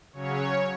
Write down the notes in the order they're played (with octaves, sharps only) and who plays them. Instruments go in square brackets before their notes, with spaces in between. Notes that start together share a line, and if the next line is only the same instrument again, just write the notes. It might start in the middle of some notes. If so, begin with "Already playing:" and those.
[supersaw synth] C#3 F#3 C#4 C#5